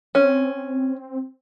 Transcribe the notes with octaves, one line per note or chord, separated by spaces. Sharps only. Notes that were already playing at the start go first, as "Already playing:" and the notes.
C4 C#4